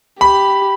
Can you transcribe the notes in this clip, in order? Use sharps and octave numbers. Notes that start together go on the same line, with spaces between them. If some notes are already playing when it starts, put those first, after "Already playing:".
G4 B5